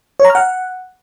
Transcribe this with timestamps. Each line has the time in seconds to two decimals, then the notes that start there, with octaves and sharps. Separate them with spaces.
0.20 C#5
0.25 A#5
0.30 F6
0.35 F#5